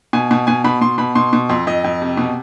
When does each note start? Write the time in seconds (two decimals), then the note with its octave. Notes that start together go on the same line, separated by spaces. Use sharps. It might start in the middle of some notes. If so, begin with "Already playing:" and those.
0.13 B2 G#5
0.31 B2
0.47 B2 G#5
0.65 B2 B5
0.81 B2 C6
0.98 B2 B5
1.15 B2 C6
1.33 B2
1.49 F2 C6
1.67 F2 D#5
1.84 F2
2.02 C3
2.17 B2